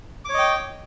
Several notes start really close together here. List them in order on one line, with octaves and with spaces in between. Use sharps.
D6 C#5 D#5 G5